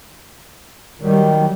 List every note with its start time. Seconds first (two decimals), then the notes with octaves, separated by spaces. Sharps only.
1.01 D#3 F#3 G3